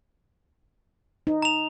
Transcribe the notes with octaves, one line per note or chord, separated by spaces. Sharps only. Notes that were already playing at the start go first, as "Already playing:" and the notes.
D#4
A#5 F7